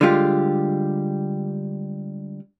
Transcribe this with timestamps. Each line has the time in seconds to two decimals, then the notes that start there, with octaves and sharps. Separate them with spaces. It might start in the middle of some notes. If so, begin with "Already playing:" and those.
0.01 D3 G3 G#3 F4 G4